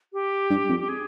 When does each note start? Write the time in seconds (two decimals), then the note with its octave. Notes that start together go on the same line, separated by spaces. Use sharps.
0.13 G4
0.50 G2
0.69 F2
0.80 G4
0.89 G#4